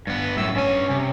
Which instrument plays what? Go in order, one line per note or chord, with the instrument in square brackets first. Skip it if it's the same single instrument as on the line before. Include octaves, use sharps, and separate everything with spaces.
[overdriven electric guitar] G2 B3
[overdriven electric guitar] F#2 A2 [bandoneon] E6
[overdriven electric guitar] G2 G#5 [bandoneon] C#4
[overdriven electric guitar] C3